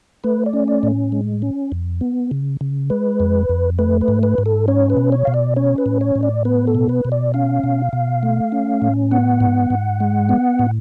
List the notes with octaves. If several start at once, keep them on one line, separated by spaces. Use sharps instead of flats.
A3 B4
D5
C#4
D5
A2
G#3
C#4
F2
B3
C#3
C#3
G#3 B4
F2
F2
A3 B4
B4
G#2
B4
G#2
A4
C#4 C#5
B4
B2
C#5
B2 F5
D5
C#4 C#5
B4
A2
C#5
A2
D5
B3 B4
A4
B2
B4
B2
D5
C#4 F5
B2
B2
A3
C#4
A2
B3 F#5
G#2
G#2
G#3
B3
A2